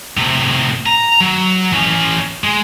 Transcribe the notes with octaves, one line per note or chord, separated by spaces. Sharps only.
A2 C3
A#5
F#3
E3 C#4
G#3